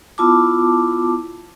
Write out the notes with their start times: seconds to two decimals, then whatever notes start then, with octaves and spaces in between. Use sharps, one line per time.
0.18 B3 E4 F4 A5 D6